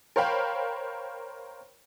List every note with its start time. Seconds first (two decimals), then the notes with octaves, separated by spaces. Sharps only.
0.16 A#4 C5 C#5 F5 G5 B5